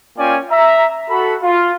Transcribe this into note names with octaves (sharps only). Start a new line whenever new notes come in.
A#3 C#4 F4 D5 G5 G#5
E5 A#5
F#4 A4 B5
F4